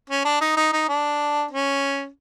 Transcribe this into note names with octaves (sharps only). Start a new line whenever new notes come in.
C#4
D4
D#4
D#4
D#4
D4
C#4